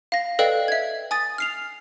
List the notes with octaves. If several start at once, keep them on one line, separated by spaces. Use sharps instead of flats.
F5 A#6
A4 B4 D5 D#5 F5 G5
E5 G#6
G#5 D#6 A6
F6 C7 F7